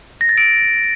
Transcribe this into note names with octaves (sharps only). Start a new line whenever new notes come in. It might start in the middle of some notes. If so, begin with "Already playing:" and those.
A#6
A6
D7